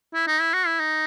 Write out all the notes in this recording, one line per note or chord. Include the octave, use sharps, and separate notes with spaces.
E4
D#4
E4
F#4
E4
D#4